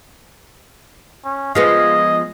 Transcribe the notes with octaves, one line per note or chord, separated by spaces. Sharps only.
C#4
F3 G#3 B3 D#5